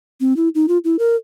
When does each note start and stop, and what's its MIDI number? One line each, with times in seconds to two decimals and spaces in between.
0.20 0.36 60
0.36 0.49 64
0.55 0.66 63
0.68 0.78 65
0.84 0.96 64
0.99 1.16 70